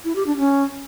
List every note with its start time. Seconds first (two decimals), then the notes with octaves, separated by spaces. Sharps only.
0.05 E4
0.16 G4
0.27 D4
0.38 C#4